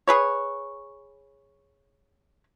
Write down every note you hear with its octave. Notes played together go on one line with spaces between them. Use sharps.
G#4 B4 C#5